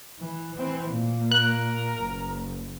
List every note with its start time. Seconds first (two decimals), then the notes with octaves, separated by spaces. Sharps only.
0.19 E3
0.56 E3 C4
0.90 A#2 A#3
1.32 A#4 F#6
2.00 F#1